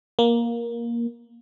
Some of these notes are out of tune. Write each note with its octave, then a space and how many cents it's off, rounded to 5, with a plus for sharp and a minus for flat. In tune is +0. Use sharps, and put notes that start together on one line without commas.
A#3 +10